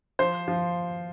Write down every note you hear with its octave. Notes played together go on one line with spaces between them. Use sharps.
F3 C5
F3